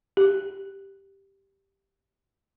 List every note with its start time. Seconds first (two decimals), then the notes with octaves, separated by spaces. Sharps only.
0.17 G4